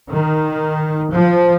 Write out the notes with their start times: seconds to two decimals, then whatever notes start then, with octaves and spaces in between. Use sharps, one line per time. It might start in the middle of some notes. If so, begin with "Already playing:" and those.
0.11 D#3
1.13 F3